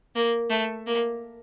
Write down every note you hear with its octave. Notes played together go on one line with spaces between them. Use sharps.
A#3
A3
A#3